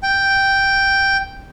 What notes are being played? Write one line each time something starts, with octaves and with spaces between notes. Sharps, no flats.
G5